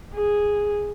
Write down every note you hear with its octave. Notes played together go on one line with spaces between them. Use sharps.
G#4